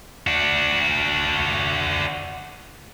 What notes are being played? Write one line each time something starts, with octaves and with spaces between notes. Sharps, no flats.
D4 F#4